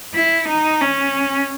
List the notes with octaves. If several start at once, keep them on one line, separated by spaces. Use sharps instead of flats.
E4
D#4
C#4